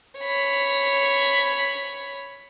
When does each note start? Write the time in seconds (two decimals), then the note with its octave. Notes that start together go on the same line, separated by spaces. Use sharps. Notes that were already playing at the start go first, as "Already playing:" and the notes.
0.20 C#5 B5